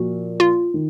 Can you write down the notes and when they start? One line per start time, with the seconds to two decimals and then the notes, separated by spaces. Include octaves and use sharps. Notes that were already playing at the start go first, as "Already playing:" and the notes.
Already playing: A#2 F3 F#4
0.40 F4
0.74 D#3